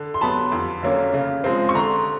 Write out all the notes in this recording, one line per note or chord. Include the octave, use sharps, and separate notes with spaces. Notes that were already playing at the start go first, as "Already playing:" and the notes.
Already playing: D3
C6
F#3 B3 A5 B5
F2
D3 F#3 A#3 C#4
C#3
F3 G#3 C4
C#6
D3 A#5 C6